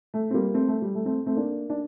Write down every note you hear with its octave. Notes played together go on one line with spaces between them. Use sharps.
A3
C4
G3 A#3
A3 C4
A3
G3
A3
A3 C4
A3 C4
A#3 D4
D4